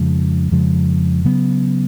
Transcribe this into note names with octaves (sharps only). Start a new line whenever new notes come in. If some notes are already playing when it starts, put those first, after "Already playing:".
Already playing: F2 C#3 F3 G#3
F2 C#3 F3 G#3
C#3 F#3 B3